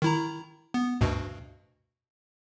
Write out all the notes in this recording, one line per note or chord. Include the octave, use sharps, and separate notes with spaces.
D#3 E4 A#5
B3
D2 G2 B2